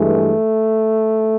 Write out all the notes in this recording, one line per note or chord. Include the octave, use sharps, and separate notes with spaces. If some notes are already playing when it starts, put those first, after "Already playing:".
Already playing: G2 E3 G#3 A3